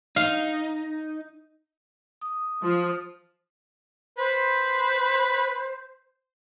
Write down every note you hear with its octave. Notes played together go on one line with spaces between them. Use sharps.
D#4 F5
D#6
F3
B4 C5